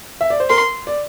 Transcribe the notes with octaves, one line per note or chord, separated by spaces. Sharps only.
E5
D5
C5
A#4 C6
D5